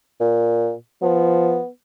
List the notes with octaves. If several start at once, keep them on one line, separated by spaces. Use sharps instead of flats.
A#2
F3 B3